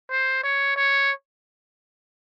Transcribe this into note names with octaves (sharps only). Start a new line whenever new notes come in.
C5
C#5
C#5